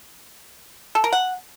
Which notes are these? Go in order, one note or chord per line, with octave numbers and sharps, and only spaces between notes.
A4
A#4
F#5